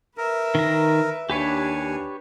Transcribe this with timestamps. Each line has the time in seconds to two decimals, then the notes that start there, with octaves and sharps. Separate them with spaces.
0.18 A#4 B4 E5
0.55 D#3 A#5
1.30 D#2 D4 G4 B4 C#5 G#5